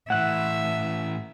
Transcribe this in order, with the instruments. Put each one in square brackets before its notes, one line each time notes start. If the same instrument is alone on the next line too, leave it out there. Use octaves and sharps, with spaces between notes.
[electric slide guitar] A2 E3 [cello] E5 [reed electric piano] F#5 F#6